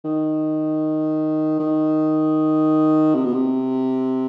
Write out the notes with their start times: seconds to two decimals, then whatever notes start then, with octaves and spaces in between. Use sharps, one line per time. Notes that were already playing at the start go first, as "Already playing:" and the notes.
0.04 D#3
1.59 D#3
3.15 C3
3.24 B2
3.33 C3